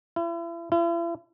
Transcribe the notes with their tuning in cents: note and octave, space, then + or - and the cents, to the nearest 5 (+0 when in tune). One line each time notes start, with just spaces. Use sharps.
E4 +40
E4 +45